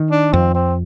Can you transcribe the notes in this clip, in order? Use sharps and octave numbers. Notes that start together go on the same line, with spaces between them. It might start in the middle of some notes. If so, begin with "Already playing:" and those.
Already playing: D#3
D4
F2 C4
C4